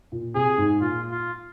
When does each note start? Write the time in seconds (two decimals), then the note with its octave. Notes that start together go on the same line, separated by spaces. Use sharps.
0.12 A#2
0.35 C3 G#4
0.58 G#2
0.80 A#2 F4
1.11 F4